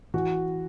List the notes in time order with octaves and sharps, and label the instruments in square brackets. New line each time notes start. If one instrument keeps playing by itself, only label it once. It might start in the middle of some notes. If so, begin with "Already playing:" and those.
[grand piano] E3 F#4